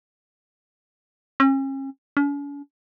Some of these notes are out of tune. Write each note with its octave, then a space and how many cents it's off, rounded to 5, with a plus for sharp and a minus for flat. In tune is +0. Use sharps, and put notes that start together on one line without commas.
C#4 -40
C#4 +45